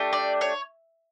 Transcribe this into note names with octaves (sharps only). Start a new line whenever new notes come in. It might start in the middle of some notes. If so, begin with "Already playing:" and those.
Already playing: A3 D4 G4
D5
C#5